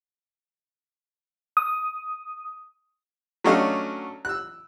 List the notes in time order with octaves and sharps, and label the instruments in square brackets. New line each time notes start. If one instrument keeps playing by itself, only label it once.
[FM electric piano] D#6
[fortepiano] F#3 A3 C#4 D4 D#5 F5
E6 F#6